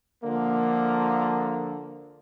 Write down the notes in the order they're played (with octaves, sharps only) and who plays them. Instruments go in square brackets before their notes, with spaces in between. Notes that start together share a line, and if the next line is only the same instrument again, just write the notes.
[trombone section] D3 F3 A#3